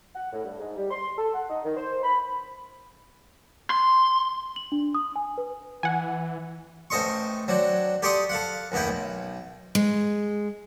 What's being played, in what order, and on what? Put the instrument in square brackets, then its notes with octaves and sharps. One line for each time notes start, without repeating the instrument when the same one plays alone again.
[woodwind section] F#5
A2
G2
G#2
G3
C6
A4
F#5
D#4
D#3
C5
B5
[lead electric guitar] C6
[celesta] F#7
D4
D#6
G#5
B4
[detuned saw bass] E3 [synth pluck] F#5 G#5
[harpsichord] A1 C4 A4 D#5 C6 C#6
F#3 C4 D4
G4 A4 D5 C6 C#6 D#6
A4 F5 F#5
A1 D#2 B3 E4 G5
B1
[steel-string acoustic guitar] G#3